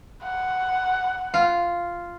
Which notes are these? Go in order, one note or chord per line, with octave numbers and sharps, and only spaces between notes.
F#5
F4